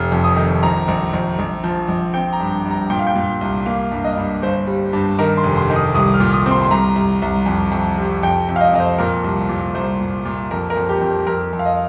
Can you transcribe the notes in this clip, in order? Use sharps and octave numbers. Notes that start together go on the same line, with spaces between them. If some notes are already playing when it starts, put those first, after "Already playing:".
Already playing: F1 F6
F2
D#6
D#3
A#1 A#5
A#1
A#1
A#1
F3
A#1
C4 G5
A#5
G2
G2
A#5
A#2 G5
F5
G5
A#2
C2
A#3 F5
G2
D#5
G2
G1 C5
G3
G2
D#3 A#4
C6
F1
C6
D#3
D#6
C2 D#6
F6
A#2
D#6
C4
C6
C6
C2 A#5
C2
C2
F2
F2
C3
F2 G5
F2
F5
D#5
F2 D#5
C5
A#2 A#4
C2
A#2
C2 C5
A#2
A#2
F2 A#4
A#4
F2
G4
F2
G4
F2 A#4
F2
F5
D#5